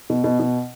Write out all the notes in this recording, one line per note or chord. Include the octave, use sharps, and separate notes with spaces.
B2
B2
B2